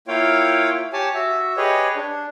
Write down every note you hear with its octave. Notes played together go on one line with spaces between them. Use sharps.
A#3 E4 F4 C#5 F5 G5
G4 C#5 G#5 A5
F#4 E5
G4 G#4 B4 C#5 D#5
D4